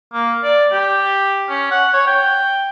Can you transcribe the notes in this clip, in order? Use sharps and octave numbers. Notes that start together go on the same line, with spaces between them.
A#3
D5
G4
C#4
F#5
C#5
G5